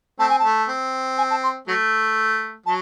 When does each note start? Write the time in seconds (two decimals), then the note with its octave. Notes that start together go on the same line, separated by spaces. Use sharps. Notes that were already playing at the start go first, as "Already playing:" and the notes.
0.19 A3 C4 A5
0.29 G#5
0.39 A5
0.44 A3
0.68 C4
1.18 G#5
1.30 A5
1.43 C6
1.68 F#3 A3
2.66 F#3 A5